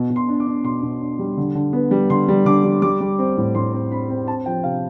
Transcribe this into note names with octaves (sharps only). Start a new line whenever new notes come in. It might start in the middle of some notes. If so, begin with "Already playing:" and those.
Already playing: B2
B2
C6
D4
D6
D4
B2 C6
B2
D4
G3
D3
D3
B3
G3
D3 C6
G3
D3 D6
G3
G3 D6
G3
C4
A2
A2 C6
C4
C4 B5
C4
C4 A5
F3 G5
C3 F5